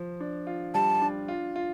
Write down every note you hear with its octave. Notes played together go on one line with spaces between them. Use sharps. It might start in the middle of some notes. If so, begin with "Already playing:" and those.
Already playing: F3
D4
F4
G3 A5
D4
F4
F4